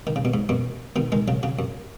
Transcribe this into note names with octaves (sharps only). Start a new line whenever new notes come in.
D#3
C#3
B2
G#2
F#2 B2
B2 D#3
D#3 G#3
C#3 F#3
C#3 F#3
F#2